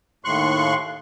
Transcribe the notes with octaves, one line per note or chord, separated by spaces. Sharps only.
D#2 A2 C6 C#6 F#6